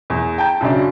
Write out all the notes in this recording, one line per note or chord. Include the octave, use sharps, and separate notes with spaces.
E2
G5 A5 A#5 G6
F#2 C#3 F#3 D4